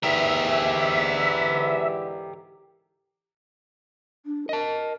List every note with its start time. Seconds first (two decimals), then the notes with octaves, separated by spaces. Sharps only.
0.03 G#2 D3 E3 G4 A#4 E5
4.25 D4
4.49 A#4 D#5 A5